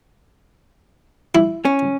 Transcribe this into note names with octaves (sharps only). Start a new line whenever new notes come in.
E4
C#4